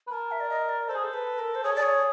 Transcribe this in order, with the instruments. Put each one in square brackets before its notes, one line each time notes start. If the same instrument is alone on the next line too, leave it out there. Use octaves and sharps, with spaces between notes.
[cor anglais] B4
[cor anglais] A#4 [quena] A5
[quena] E5
D5
D#5
D5
[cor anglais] A4 [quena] C5
[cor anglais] G#4
A4
[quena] B4
A#4
C5
[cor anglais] G#4 [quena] C#5
[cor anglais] A4
[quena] D5
[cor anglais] G#4 [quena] C#5